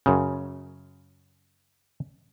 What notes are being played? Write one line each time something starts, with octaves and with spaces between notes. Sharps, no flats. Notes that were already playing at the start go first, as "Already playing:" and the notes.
F#2 C#3